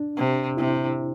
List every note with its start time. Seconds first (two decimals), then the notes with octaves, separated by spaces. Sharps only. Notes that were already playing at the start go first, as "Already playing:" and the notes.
Already playing: D4
0.17 C3
0.57 C3 E4